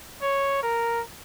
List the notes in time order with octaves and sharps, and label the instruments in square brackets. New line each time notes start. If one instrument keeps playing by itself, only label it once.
[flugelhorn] C#5
A#4